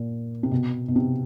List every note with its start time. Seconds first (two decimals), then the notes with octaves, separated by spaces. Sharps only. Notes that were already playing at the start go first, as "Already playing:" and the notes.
Already playing: A#2
0.43 C3
0.51 B2
0.88 B2
0.96 C3